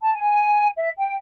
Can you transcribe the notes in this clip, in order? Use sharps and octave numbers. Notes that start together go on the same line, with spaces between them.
A5
G#5
E5
G5